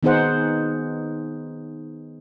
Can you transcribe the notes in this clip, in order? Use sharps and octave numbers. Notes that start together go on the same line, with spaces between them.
D#3 B3 D#4 G#4 C5 F#5